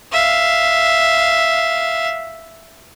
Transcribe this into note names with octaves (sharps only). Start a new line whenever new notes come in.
E5 F5